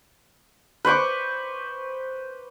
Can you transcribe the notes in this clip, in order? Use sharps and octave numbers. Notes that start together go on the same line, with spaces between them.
B4 C5 C#6 D6